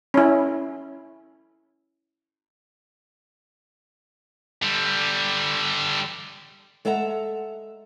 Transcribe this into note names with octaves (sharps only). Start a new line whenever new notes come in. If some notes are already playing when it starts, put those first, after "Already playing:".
C#4 E4
D3 G3
G#3 A4 E5 F#5 A#5